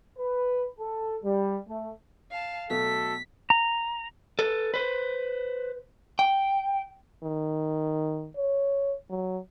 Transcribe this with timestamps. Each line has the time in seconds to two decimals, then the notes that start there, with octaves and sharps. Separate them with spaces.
0.18 B4
0.79 A4
1.24 G3
1.68 A3
2.31 F5 A5
2.70 B2 F#3 A3 A4 B6
3.50 A#5
4.39 A4 B4
4.74 B4 C5
6.19 G5
7.24 D#3
8.36 C#5
9.10 F#3